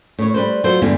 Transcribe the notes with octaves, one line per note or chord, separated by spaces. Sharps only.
A2 C#5
G3 B4 C5
F#3 F4 A4 C5
E2 G2 D3 E3 G#3